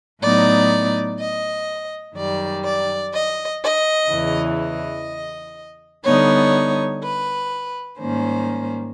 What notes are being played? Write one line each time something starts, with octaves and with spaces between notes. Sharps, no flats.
A2 F#3 B3 D#4 D5
D#5
F#2 D#3 G3 D5
D5
D#5
D#5
E2 C#3 E3
D#5
D3 G3 B3 D#4 C#5
B4
G#2 D#3 G3 A#3 C#4 C5